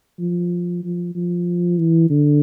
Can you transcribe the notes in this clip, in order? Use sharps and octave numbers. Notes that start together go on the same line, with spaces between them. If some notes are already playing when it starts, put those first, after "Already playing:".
F3
F3
F3
E3
D3